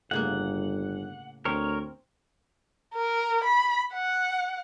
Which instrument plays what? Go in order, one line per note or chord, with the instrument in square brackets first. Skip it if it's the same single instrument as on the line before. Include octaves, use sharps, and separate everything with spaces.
[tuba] G1 [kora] A2 C#3 A#3 [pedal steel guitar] F#5
[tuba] D2 [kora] C4 [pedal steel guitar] A#4 C#5
[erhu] A#4
B5
F#5